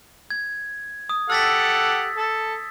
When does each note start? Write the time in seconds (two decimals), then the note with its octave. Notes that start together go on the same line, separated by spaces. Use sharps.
0.30 G#6
1.09 D#6
1.30 G4 A4 F#5 E6 A6 B6
2.17 A4